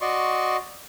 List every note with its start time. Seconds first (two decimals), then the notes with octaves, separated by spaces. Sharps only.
0.01 F#4 D5 D#5 C6 C#6